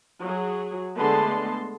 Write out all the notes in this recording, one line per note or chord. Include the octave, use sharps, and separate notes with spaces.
F#3 G#4
D3 G#3 A3 B3 A5 C6